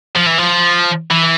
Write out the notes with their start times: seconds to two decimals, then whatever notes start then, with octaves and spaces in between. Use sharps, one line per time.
0.16 F3
0.26 E3
0.38 F3
1.11 E3